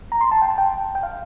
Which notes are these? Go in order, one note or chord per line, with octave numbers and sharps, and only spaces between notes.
A#5
C6
A5
G5
A5
G5
G5
F5